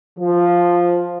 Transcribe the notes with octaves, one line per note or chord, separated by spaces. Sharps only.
F3